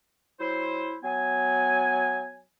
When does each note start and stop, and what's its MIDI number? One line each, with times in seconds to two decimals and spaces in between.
0.40 0.95 54
0.40 0.95 64
0.40 0.95 72
1.04 2.43 54
1.04 2.43 59
1.04 2.43 80